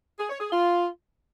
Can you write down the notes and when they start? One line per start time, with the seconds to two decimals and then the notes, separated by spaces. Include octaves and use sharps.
0.19 G#4
0.30 C#5
0.40 G#4
0.51 F4